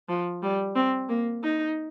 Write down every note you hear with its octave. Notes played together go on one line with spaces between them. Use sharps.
F3
G3
C4
A#3
D#4